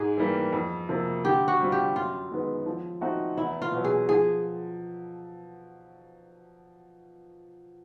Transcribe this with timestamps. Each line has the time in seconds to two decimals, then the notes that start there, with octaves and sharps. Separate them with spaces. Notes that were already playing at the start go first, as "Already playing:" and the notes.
Already playing: G#2 G#4
0.18 E3 G3 A#3
0.53 F2
0.89 C3 F3 A#3
1.25 D3 G4
1.48 F#4
1.60 G3 C4 F4
1.72 G4
1.95 F#2 F4
2.31 D#3 G#3 B3
2.66 F3
3.01 A3 C4 D#4 F#4
3.38 E2 E4
3.62 F4
3.72 B2 F#3
3.84 G#4
4.09 F3 G#4